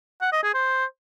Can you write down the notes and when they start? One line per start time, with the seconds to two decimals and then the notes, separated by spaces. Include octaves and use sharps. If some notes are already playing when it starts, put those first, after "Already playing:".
0.21 F#5
0.32 D#5
0.43 G#4
0.54 C5